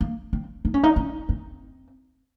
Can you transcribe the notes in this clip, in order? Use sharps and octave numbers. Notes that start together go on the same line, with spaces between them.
A#3
C4
D#4
C#4
D#4
C#4
C4